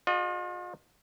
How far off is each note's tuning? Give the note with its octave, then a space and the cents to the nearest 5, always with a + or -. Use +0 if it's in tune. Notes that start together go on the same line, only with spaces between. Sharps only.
F4 +40 G#4 -10 D#5 -25